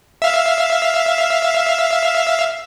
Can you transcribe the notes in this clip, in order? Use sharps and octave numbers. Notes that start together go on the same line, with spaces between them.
E5 F5